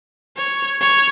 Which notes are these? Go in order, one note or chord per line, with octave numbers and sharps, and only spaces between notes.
C#5
C#5